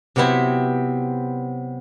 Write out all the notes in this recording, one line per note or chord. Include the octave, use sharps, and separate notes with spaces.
C3 F#3 B3 C4 E4